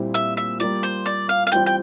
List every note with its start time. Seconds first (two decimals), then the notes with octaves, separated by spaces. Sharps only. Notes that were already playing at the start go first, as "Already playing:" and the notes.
Already playing: A#2 G3 C4 E4 G4
0.14 E5
0.37 E5
0.60 G3 A#3 F4 D5
0.83 C5
1.06 D5
1.29 F5
1.47 F5
1.52 E3 G3 C4 F4 G5
1.66 G5